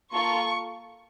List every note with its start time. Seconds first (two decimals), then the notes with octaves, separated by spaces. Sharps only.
0.12 A#3 F4 A4 C#6